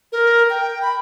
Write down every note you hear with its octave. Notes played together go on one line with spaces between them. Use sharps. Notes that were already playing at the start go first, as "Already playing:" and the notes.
A#4
G5
B5